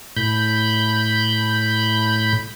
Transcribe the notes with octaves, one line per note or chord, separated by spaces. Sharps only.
A2 B5 G6